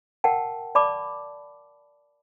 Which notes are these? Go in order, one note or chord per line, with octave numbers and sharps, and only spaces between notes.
A#4 F#5 G5 A5
D5 A5 B5 D6